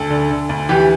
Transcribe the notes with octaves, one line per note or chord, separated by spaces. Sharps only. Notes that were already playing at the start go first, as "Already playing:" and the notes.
Already playing: D2 A4
D3
D3
D2
E3 G4